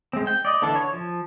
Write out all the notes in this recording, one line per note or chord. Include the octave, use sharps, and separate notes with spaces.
G#3 C4
G5
D5 D#5
D3 E3 D4 A4
C#5
F3